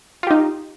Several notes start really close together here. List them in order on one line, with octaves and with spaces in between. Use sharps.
F4 G4 D#4